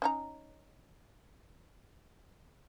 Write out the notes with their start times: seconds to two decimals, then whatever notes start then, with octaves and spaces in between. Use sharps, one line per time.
0.02 C#4 D#4 A#5